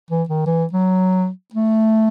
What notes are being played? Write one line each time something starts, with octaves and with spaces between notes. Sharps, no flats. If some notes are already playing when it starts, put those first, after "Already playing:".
E3
D#3
E3
F#3
A3